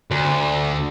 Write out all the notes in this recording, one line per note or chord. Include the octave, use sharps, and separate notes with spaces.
D2